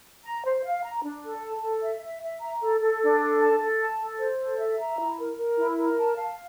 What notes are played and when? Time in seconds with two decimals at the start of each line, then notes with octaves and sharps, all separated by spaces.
0.25 A#5
0.44 C5
0.63 F5
0.83 A#5
1.03 D4
1.23 A4
1.43 A5
1.62 A4
1.83 E5
2.02 E5
2.22 E5
2.41 A#5
2.61 A4
2.80 A4
3.01 D4
3.20 A4
3.41 A5
3.60 A4
3.80 A5
4.00 A4
4.19 C5
4.39 A4
4.59 E5
4.79 A#5
4.98 E4
5.19 A#4
5.38 A#4
5.58 E4
5.78 A#4
5.97 A5
6.16 F5